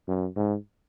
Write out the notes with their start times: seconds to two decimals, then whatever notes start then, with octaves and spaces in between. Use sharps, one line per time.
0.08 F#2
0.36 G#2